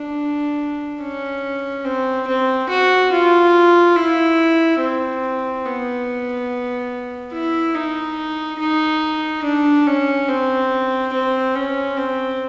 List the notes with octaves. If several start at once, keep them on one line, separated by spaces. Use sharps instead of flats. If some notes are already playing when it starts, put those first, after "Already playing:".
Already playing: D4
C#4
C4
C4
F#4
F4
E4
C4
B3
E4
D#4
D#4
D4
C#4
C4
C4
C#4
C4